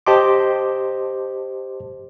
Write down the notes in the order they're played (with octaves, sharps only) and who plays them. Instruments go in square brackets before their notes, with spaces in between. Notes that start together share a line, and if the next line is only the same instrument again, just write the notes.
[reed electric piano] G4 C5 D#5 A5 C6 D6